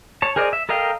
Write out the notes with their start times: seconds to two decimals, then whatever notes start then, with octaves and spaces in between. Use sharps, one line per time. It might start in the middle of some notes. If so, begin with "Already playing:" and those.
0.22 C#5 A5
0.36 G#4 A#4 C5 D5 D#5
0.53 E5
0.69 A4 A#4 D#5 F5 G5